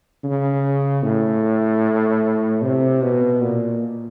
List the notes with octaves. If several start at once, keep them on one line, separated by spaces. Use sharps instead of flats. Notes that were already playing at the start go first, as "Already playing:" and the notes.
C#3
A2
C3
B2
A#2